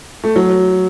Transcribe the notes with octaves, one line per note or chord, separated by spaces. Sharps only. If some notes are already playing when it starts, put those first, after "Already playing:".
A3
F#3